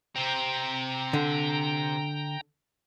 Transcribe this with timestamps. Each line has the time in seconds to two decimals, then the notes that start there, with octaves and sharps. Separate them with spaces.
0.16 C3 C4 G5 A#5
1.13 D3